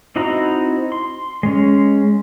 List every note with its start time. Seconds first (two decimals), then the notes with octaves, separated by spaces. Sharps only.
0.16 C4 D#4 E4 F#4 A#5
0.92 C6
1.43 G#3 C#4